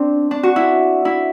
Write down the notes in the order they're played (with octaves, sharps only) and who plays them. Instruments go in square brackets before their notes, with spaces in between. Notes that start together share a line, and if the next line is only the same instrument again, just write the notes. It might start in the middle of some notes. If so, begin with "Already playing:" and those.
Already playing: [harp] C4 D4
D4
F#4
E4
E4